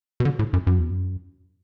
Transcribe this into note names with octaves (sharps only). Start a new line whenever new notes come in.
B2
D3
A2
F#2
F#2
E2
F#2